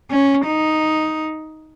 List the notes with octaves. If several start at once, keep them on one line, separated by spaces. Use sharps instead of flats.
C#4
D#4